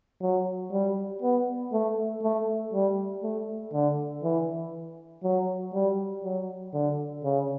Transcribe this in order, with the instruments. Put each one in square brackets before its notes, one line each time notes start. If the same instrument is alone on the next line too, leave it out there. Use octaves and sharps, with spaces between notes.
[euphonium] F#3
G3
B3
A3
A3
G3
A3
D3
E3
F#3
G3
F#3
D3
C#3